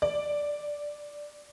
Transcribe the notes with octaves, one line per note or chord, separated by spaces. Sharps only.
D5